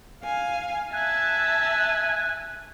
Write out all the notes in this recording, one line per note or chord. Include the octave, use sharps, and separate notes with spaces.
F5 G#5
E5 G#5 A5 F#6